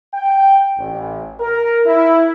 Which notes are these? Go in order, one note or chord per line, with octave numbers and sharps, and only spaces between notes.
G5
A1
A#4
E4